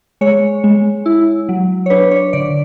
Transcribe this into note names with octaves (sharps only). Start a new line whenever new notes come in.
G#3 C#5
G#3
E4
F#3
C#5
D4 B4
C#5
D3 D5